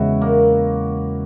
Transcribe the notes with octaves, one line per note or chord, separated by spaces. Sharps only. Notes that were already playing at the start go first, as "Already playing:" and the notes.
Already playing: E2 C#3 E3 G#3 C#4 E4 F#4
A#3